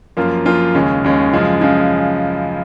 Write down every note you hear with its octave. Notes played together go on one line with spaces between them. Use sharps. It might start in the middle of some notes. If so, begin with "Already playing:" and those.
F#2 F3 A#3 F4
F#2 F3 A#3 F4
D#2 C#3 G#3 C#4
D#2 C#3 G#3 C#4
F#2 C#3 F3 G#3
C#3 F3 G#3